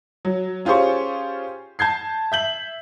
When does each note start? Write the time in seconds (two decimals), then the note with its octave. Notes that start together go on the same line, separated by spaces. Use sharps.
0.25 F#3
0.65 C#4 F4 G4 G#4 C5 C#6
1.79 A5 G6 G#6 C7
2.32 E5 G6 F#7